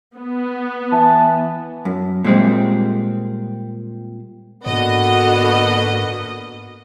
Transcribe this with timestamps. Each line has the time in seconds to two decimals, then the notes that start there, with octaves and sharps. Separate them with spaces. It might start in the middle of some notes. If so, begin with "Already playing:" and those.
0.16 B3
0.92 E3 A5
1.85 F#2
2.24 A#2 G3 G#3 C4
4.66 G#2 D3 A#3 B3 F#4 D#5